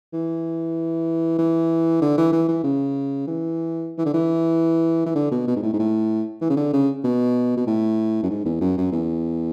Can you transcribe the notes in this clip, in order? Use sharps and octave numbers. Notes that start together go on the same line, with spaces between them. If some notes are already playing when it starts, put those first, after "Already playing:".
E3
E3
D3
E3
E3
E3
C#3
E3
E3
D3
E3
E3
D3
B2
B2
G#2
A2
G#2
A2
E3
C#3
D3
C#3
B2
B2
A2
F#2
G#2
E2
F#2
F#2
E2